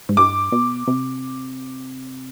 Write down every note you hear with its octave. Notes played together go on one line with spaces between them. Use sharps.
G#2
G2 D6
B2
C3